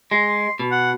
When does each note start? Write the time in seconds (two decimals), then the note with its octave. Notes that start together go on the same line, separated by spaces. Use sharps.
0.11 G#3 C6
0.60 B2
0.71 F#5